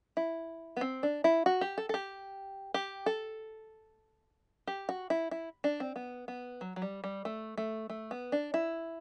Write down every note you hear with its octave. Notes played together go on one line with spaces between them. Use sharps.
E4
B3
C4
D4
E4
F#4
G4
A4
A4
G4
G4
A4
G4
F#4
E4
E4
D4
C4
B3
B3
F#3
F#3
G3
G3
A3
A3
A3
B3
D4
E4